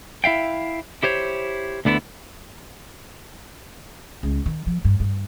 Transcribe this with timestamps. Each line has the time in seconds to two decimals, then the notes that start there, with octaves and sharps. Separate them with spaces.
0.24 E4 E5 F5 G5
1.03 E4 G4 C5 C#5
1.85 D2 D3 B3 E4
4.23 C#2
4.46 D#3
4.67 F3
4.85 G2
5.00 G2